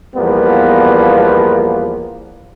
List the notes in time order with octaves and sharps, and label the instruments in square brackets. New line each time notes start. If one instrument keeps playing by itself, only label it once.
[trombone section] E2 F3 G3 A#3 B3